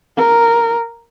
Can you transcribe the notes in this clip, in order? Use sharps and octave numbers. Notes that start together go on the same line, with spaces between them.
A#4